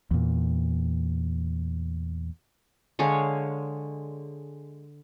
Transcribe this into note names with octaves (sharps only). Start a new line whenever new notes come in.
E2 A#2
D3 G#3 C#5 F5